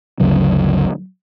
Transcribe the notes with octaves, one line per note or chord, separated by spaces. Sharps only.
G1 D2 C#3 F#3